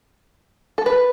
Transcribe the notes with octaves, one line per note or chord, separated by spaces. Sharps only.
A4
B4